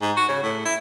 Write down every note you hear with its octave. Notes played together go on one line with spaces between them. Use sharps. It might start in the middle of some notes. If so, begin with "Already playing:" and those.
G#2
F#4
C#3
A2
E4